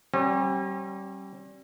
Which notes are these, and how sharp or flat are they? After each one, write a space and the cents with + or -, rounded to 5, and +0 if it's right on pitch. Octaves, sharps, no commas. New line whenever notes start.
G3 -25 C#4 -45